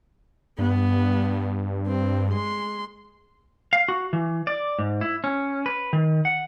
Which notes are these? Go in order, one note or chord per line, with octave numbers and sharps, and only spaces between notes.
G2 B3
C4
G#3 C6
F5
F#4
E3
D5
G#2
E4
C#4
B4
D#3
F#5